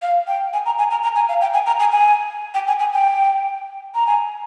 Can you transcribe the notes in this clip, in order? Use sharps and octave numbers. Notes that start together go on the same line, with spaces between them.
F5
G5
G#5
A#5
G#5
A#5
A#5
G#5
F5
G5
G#5
A#5
G#5
G#5
G5
G#5
G#5
G5
A#5
G#5